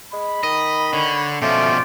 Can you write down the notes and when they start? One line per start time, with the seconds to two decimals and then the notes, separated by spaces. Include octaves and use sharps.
0.13 G#3 B5
0.43 D#3 D#5
0.93 D3 C#5
1.42 B2 F3 A3 C#4 F4 D5 G5